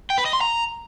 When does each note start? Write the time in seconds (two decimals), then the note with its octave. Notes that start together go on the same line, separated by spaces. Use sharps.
0.10 G5
0.18 B4
0.25 D#5
0.33 C6
0.41 A#5